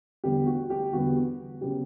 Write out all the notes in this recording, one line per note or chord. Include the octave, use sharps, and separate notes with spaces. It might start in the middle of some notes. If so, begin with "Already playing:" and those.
E2 D3 G3 B3 G4
F#4
G4
E2 D3 G3 B3 F#4
C#3 F#3 B3 G4